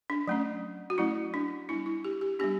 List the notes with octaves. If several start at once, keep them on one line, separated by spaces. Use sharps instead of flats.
D4
F#3 A3 C#4
F#4
F#3 A3 C#4 E4
D4
G3 B3 D4 E4
E4
G4
G4
G3 B3 D4 G4